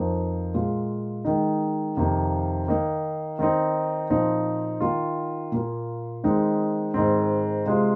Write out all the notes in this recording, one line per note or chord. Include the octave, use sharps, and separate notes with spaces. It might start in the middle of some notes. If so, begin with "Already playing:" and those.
Already playing: F2 F3 A#3 D#4
A#2 G#3 F4
D#3 G#3 D#4
F2 C3 D#3 A#3
D#3 A#3 D#4
D#3 C4 D#4
A#2 F3 C4 D#4
D#3 A#3 F4
A#2 A#3 F4
D#3 G#3 C4 D#4
G#2 D#3 C4
C3 G#3 F4